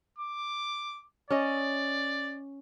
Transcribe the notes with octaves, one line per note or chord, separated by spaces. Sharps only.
D6
C#4 D5 D#5